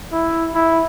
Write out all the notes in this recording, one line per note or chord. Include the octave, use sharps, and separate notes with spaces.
E4
E4